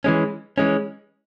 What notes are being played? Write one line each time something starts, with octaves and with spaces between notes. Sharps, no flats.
E3 G#3 C#4
E3 G#3 C#4